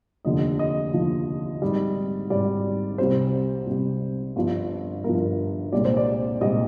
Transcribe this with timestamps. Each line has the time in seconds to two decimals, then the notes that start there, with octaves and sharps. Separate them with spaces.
0.25 F1 D#2 D3 F3 D#5
0.59 D#5
0.93 F1 D#2 D3 F3
1.62 G#1 G#2 G3
2.30 G#1 G#2 G3 D5
2.98 C2 C3 G3 C5
3.67 C2 C3 G3
4.36 G1 G2 F3
5.04 G1 G2 F3 A#4
5.72 C2 A#2 G#3 D5
5.85 C5
5.97 D5
6.41 C2 A#2 G#3 D#5